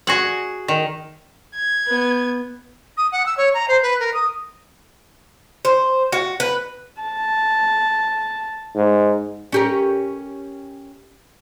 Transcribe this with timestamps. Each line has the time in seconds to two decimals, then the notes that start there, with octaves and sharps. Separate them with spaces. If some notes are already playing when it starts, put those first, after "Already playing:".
0.07 F#4 G#4 F#5
0.68 D#3
1.55 G#6
1.88 B3
2.97 D#6
3.12 F#5
3.26 E6
3.37 C#5
3.54 A#5
3.68 C5
3.82 B4
4.00 A#4
4.14 D#6
5.65 C5
6.12 F#4
6.40 B4
7.02 A5
8.75 G#2
9.52 C#4 G4 A#4